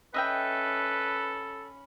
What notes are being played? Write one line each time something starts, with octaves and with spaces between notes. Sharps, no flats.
C#4 A4 B4 D#5 E5 G5 B5